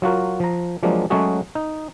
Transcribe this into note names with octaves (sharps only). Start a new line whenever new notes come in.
F#3 F4 F#4 A#4
F3 A#5
F3 F#3 G#3 A#3 D4
F#3 G#3 A3 C#4 F#4 G#4
D#4